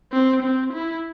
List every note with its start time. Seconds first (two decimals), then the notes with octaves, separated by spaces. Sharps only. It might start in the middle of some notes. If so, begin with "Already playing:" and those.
0.13 C4
0.42 C4
0.73 E4